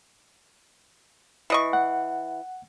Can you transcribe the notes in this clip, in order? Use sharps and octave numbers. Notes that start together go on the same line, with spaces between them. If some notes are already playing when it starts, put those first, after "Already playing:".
E3 D#5 C#6
F#5